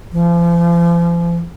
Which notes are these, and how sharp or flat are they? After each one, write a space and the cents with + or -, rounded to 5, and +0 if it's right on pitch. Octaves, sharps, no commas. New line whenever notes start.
F3 -40